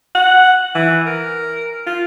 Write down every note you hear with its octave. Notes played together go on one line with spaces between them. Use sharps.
F#5
E3
A#4
F4